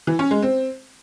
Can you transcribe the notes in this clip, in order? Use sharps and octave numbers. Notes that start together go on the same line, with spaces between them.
E3
C#4
G#3
C4